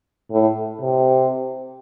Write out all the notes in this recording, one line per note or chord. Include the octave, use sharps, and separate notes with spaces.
A2
C3